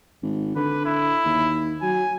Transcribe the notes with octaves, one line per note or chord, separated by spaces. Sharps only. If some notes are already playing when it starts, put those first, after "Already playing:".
G#1
D3 B4
E4
D#2
F#3 G#5